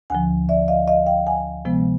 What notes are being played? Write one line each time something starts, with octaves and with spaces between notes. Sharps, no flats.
D2 D3 F3 F#5 G#5
D5 E5
D#5 F5
D#5 F5
F5 G5
F#5 G#5
C3 F3 G#3 B3